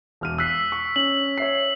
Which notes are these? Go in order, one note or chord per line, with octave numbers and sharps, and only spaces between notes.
E1 F6 D#7
E6 F#6 B6 C7
C#6
C#4 F#7
C#5 E5 C7